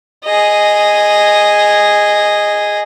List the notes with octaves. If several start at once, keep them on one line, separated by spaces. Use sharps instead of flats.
G#4 D#5